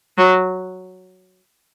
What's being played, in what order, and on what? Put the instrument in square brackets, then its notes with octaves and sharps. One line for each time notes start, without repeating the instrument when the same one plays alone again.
[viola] F#3